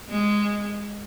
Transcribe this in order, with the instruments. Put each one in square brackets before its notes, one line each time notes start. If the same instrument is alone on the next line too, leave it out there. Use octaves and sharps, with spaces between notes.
[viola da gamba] G#3